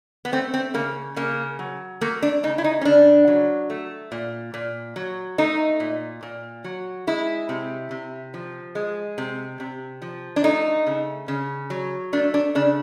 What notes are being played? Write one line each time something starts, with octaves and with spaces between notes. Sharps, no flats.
B3
A3 C4
C4
C#3 A#3
C#3 A#3
F#3
A3 A#3
D4
C#3 D#4
E4
D#4
C#4
C#3 D4
F#3
A3
A#2
A#2
F#3
A3 D#4
A#2
A#2
F#3
G#3 E4
C3
C3
F3
G#3
C3
C3
F3
D4
A3 D#4
C#3
C#3
F#3
A3 D4
D4
C#3 D4